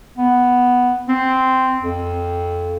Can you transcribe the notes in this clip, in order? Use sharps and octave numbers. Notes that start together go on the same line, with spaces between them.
B3
C4
F2